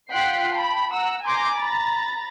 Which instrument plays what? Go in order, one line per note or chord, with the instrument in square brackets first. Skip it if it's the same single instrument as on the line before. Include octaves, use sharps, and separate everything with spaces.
[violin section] F4 F#5 G5 F#6 B6 C7
G5 A5 B5
F#5 A#5 E6
G#5 A#5 C6 D6 G6 A#6
A#5 B5 A6 A#6